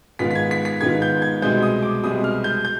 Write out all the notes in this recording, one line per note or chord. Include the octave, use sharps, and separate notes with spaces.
G#2 D#3 B3 F4 B6
B6
G#6
B6
B6
G#2 D#3 B3 F4 G#6
G6
G#6
C2 B2 G#3 C4 G6
D#6
D6
C2 B2 G#3 C4 D#6
F6
G6
G6